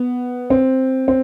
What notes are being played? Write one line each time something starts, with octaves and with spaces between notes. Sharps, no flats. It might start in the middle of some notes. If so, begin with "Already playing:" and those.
Already playing: B3
C4
C4